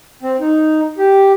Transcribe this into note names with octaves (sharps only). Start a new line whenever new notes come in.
C4
D#4
G4